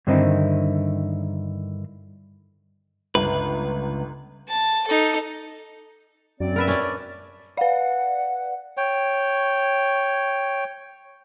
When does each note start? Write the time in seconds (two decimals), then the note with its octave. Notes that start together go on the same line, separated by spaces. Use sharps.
0.07 G2 D3 D#3 C4 D#4 E4
3.15 G1 C#2 B4
4.48 A5
4.87 D#4 A4
6.40 F#2 C4 D5
6.56 A#4 B4 E5
6.68 C#4 D4
6.82 D5
7.57 B4 D5 F5 F#5
8.77 C#5 G5